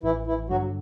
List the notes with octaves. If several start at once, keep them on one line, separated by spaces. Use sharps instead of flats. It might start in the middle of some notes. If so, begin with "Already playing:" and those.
A1 E3 E4
E3 E4
G2 D3 F#3 F#4